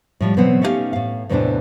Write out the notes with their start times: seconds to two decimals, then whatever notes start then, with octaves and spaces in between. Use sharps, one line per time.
0.20 A2 F3 G3
0.37 B2 E3 F#3 B3 C4 F#5
0.61 A3 C#4 D#4 E4 G4 F5
0.93 A2 F5
1.29 E2 A2 C3 D#3 E3 D4